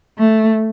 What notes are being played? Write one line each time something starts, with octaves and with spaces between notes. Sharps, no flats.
A3